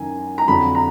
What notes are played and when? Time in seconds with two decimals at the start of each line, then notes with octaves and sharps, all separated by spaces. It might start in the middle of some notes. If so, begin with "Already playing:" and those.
Already playing: F#2 D#3 G#5
0.38 A#5
0.48 F2 D3 F#3 B5
0.75 A#5